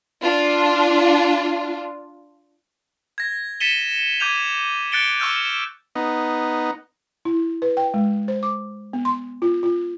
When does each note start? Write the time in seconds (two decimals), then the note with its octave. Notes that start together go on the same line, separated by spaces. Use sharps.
0.21 D4 F4
3.18 G#6 A#6
3.60 A6 B6 C#7 D#7 E7 G7
4.20 D6 G6 G#6 D#7 F7
4.92 F#6 A6 C#7 D7 G7
5.20 C#6 E6 F6 G6
5.95 B3 D#4
7.25 E4
7.62 B4
7.77 G5
7.94 G#3
8.28 C5
8.43 D6
8.93 B3
9.05 C6
9.42 F4
9.63 F4